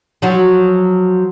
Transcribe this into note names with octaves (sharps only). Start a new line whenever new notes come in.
F3 F#3 F#4